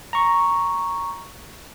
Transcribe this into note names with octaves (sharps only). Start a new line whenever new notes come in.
A#5 C#6